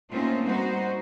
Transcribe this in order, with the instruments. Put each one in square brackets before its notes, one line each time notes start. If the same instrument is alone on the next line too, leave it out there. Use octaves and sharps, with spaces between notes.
[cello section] A3 A#3 C4 C#4 D#4 F4
G3 D#4 F#4 C5